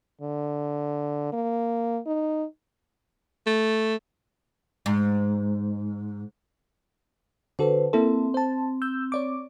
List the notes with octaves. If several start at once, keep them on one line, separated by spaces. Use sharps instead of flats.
D3
A#3
D#4
A3
G#2
D3 F#4 A4 B4 C5
A#3 C4 E4 A4
C5 A5
E6 G6
C#5 D5 D6